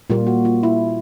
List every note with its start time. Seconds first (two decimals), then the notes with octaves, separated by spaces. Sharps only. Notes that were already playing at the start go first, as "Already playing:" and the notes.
0.10 A#2 G3 A#3 F4
0.27 F#4
0.45 F4
0.63 E4